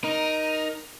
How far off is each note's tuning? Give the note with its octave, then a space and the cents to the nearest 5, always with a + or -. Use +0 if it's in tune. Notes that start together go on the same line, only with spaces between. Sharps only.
D#4 +0 A#4 +15